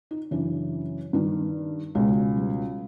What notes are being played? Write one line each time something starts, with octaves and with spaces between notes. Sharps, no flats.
D#4
F#2 C#3 E3 D4
G2 D#3
C#2 B2 G#3
G3